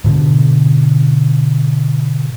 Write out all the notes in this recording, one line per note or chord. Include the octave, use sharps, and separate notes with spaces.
G#2 B2 D3